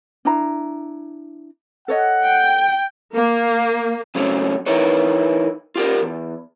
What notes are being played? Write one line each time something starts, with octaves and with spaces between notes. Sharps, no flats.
D4 E4 A#5
A4 C#5 D#5 F#5
G5
A#3
C#3 F#3 A3 C4 C#4
E3 D#4 E4 A#4 B4 C#5
F4 G4 A#4 D5
E2